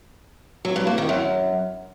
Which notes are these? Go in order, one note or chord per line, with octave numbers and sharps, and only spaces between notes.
F#3
G2
A#3
D#3
F#2